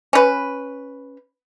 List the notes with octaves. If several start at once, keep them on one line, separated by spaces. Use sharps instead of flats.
C#4 B4